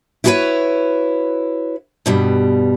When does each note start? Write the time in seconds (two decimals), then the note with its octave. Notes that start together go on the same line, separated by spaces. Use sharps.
0.24 E4 F#4 G#4 A#4 B4 C#5
2.06 G2 B2 G3